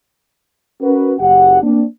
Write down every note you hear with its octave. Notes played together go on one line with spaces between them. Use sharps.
C#4 F#4 A#4 B4
F#1 G4 F#5
A#3 C4 D4